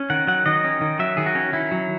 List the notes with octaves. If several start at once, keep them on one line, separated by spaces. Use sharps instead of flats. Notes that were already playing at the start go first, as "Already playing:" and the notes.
Already playing: C#4
D#3 F#5
F#3 F#5
D#3 D#5
C#4
D#3
F#3 E5
D#3 G#4
F#4
C#4
D#3 E4
F#3